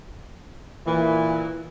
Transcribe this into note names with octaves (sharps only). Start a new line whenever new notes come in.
A#2 E3